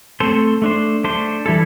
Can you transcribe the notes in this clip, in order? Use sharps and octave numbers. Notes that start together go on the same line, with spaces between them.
A3 C4 A4 C5
A3 D4 C5
A3 D4 C5
E3 G3 E4 A4